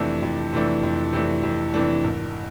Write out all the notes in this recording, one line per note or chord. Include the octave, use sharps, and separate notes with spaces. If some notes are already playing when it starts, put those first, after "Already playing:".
Already playing: F2 C3 E3 A3 D4
F2
C3 E3 A3 D4
F2
C3 E3 A3 D4
F2
C3 E3 A3 D4
G#1